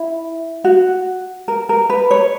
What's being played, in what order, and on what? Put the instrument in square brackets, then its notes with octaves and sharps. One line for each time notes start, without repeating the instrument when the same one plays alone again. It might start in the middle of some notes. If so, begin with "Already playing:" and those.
Already playing: [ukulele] E4
F#4
A#4
A#4
B4
C#5